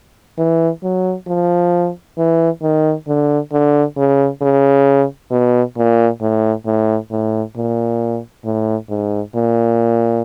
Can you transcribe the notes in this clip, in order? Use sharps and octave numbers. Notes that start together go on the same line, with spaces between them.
E3
F#3
F3
E3
D#3
D3
D3
C#3
C#3
B2
A#2
A2
A2
A2
A#2
A2
G#2
A#2